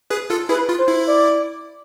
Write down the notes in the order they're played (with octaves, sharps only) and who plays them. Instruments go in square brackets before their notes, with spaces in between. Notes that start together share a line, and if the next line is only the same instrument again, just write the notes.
[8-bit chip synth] G#4 B4
F4 A4
[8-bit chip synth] E4 G#4 [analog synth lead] B4
[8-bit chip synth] F4
[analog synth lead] C5
[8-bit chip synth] E4
[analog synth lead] D5